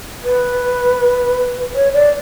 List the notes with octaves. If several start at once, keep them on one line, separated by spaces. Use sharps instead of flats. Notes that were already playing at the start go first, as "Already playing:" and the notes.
B4
C#5
D5